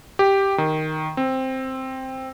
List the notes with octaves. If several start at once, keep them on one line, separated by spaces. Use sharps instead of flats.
G4
D#3
C4